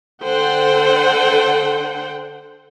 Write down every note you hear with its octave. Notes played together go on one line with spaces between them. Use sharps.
D3 A4 C5 F#5 G5